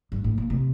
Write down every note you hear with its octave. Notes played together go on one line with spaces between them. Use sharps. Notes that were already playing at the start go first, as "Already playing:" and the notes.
G2
A2
A#2
C3